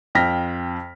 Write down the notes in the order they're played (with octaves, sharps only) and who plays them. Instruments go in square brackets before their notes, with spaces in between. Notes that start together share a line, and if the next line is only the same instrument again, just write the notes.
[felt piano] F2 G5 F6 A#6 B6